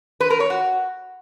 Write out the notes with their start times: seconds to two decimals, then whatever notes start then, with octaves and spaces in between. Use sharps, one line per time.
0.20 B4
0.30 A#4
0.40 C#5
0.50 F#4